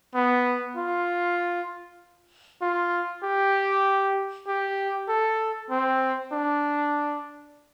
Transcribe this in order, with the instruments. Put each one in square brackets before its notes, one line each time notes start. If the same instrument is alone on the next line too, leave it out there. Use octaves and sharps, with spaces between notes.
[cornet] B3
F4
F4
G4
G4
A4
C4
D4